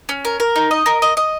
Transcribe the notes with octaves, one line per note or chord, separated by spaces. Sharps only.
C#4
A#4
A#4
D#4
D#5
A#4
D#5
D#5